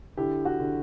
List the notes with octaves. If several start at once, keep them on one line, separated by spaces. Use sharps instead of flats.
D3 E4 G4
F#4
D3